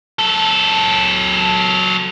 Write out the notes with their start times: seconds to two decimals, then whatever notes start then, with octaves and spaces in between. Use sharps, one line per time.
0.19 F#3 A4